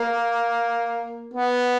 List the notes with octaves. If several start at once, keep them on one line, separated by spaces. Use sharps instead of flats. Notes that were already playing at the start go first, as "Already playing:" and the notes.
Already playing: A#3
B3